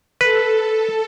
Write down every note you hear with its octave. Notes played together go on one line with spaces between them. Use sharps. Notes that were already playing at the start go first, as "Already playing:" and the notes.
A4 B4